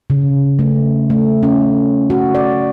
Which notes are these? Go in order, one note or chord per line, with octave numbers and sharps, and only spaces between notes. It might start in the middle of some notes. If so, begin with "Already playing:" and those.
C#3
A3
A3
C#4
F#4
D5